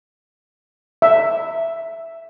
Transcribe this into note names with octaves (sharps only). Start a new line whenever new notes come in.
E5